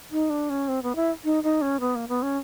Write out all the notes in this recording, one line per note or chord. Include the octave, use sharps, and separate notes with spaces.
D#4
D4
C#4
C4
B3
E4
D#4
D#4
C#4
B3
A#3
B3
C#4